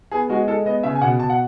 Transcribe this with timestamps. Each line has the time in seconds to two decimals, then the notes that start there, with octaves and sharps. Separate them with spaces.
0.12 B3 G#4
0.29 G#3 F#4
0.48 G#3 A4
0.65 B3 D#5
0.83 C#3 E5
0.95 G#5
1.01 B2 F#5
1.19 B2 A5
1.29 F#5